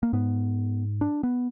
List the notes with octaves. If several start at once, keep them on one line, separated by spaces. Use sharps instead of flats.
A#3
G#2 B3
D4
B3